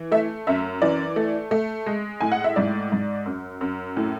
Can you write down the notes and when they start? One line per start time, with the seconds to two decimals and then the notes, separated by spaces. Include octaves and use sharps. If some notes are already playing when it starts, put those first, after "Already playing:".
Already playing: E3
0.12 A3 E5
0.47 F#2 E5
0.82 E3 D5
1.16 A3
1.51 A3
1.86 G#3
2.21 A2 G#5
2.32 F#5
2.44 E5
2.56 G#2 D5
2.92 G#2
3.26 F#2
3.61 F#2
3.97 A2